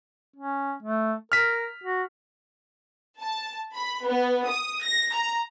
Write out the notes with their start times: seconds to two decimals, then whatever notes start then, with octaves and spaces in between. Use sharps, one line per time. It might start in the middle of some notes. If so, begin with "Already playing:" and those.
0.36 C#4
0.83 A3
1.32 A#4 F6 B6
1.84 F#4
3.21 A5
3.76 B5
4.07 B3
4.48 D#6
4.83 A#6
5.14 A#5